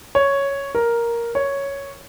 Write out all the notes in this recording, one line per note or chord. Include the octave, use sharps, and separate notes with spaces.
C#5
A#4
C#5